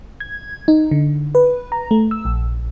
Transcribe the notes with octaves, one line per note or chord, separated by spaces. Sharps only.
G#6
D#4
D3
B4
A#5
A3
E6
A#1